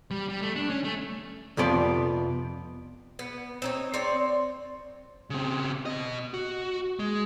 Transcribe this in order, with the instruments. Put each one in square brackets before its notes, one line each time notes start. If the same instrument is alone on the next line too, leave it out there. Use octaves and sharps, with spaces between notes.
[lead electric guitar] G3
G3
A3
D4
C#4
A3
[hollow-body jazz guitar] F2 C3 F3 B3 D5
[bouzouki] B3
C4 D#4 C#5
C4 C#5 D5
[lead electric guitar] C#3 C4
B2 D#5
F#4
G#3